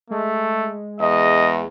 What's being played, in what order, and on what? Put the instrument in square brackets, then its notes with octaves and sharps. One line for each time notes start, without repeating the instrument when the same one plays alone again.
[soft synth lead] G#3 [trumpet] A3
[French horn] E2 [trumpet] D#5